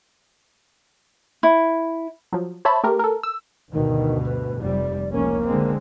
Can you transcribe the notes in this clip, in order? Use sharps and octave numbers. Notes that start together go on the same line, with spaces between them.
E4
F3 F#3
C5 C#5 E5 A5 B5
A3 G4 A#4
A4 A#4
E6
D2 G2 B2 D#3
B4
F1 G3 D5
F1 C#2 A#3 C#4
D3 G#3 C4